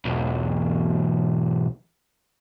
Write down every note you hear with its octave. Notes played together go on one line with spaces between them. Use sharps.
B1 E2